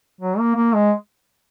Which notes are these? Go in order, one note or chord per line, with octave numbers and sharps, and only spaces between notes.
F#3
A#3
A#3
G#3